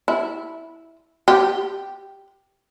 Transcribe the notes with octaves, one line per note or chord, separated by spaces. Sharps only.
E4
G4